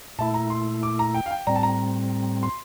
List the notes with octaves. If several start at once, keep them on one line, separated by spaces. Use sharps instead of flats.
A#2 A3 E4 A5
A#5
C6
D6
A#5
G5
F5
G5
A2 G3 C4 A#5
A5
A#5
C6